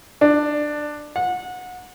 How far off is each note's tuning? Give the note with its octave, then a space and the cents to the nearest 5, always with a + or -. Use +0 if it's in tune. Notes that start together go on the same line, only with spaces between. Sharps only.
D4 +15
F#5 -25